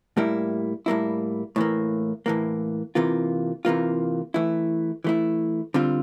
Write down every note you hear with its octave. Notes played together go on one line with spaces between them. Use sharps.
A2 G3 A#3 E4
A2 G3 A#3 E4
A2 E3 A#3
A2 E3 A#3
C3 E3 A#3 F4
C3 E3 A#3 F4
E3 A3 E4
E3 A3 E4
D3 G3 C4 F4